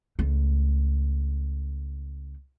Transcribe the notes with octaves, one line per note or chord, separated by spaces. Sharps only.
C#2 A3